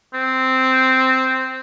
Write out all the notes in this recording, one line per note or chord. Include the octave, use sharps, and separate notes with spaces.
C4